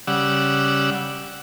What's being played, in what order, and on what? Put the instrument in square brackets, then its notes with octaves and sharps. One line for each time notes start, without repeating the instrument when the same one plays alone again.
[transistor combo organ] C#3 G3 D5 F#5 E6